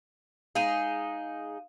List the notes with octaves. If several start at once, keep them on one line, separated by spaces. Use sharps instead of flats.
G#3 D#4 G#4 F5 D#7